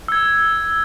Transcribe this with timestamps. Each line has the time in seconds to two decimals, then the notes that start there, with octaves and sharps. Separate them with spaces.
0.08 E6 G#6